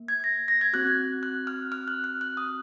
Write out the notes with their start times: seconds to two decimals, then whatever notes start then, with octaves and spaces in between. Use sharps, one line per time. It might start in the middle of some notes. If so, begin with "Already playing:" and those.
Already playing: A#3
0.08 G#6
0.24 A#6
0.48 A#6
0.61 G#6
0.73 C4 F#4 F#6
0.87 G#6
1.23 F#6
1.47 F6
1.72 F6
1.88 F#6
2.04 F#6
2.21 F#6
2.37 D#6